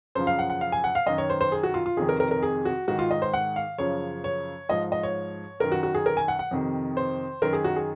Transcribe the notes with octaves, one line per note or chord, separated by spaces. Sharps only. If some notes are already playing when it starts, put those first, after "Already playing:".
F#2 C#3 F3 C5
F5
F#5
F#5
F5
G#5
F#5
F5
F#2 D#3 D#5
C#5
C5
C5
G#4
F#4
F4
F4
F2 C3 D#3 G#4
A#4
A#4
A#4
G#4
F#4
G#2 D#3 F#4
F4
D#5
C5
F#5
F5
F#2 C#3 F3 C#5
C#5
G#2 F3 D#5
D#5
C#5
F#2 D#3 A#4
F#4
F#4
G#4
A#4
G#5
F#5
F#5
F2 C3 D#3
C5
F#2 D#3 A#4
G#4
F#4
G#4